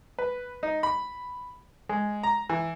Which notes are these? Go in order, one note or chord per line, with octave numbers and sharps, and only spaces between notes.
B4
D#4
B5
G#3
A#5
E3